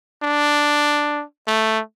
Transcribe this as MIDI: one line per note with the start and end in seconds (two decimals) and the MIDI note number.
0.23 1.24 62
1.47 1.80 57